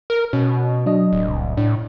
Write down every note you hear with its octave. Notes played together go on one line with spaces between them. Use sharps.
A#4
B2 C#4
F#3 D4 D#5
D1
C2
A2 D4